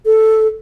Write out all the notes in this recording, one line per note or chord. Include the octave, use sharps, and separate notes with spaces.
A4